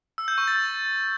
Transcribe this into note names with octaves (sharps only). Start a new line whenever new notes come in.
E6
G6
C#6
A6